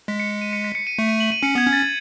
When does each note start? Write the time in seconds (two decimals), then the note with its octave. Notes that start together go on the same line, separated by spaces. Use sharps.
0.08 G#3 B6
0.20 C#7
0.31 C#7
0.41 D#7
0.53 C#7
0.64 B6
0.75 C#7
0.87 D#7
0.99 A3 C#7
1.09 D#7
1.20 F#7
1.32 D#7
1.43 C#4 C#7
1.55 B3 G#6
1.67 C#4
1.73 A6